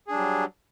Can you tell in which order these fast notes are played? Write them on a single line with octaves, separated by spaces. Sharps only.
G#4 D4 G3 F#3